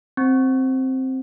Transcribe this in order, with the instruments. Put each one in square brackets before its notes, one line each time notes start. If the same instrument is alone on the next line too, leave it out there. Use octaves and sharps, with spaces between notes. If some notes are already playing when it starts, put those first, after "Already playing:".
[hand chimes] C4